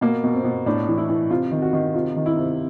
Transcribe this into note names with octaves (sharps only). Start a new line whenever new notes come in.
B2 A#3
B2
C4
B2
A2 D4
E3
E4
E3
C3 F4
D#3
F#4
D#3
C3 F4
D#3
E4
C3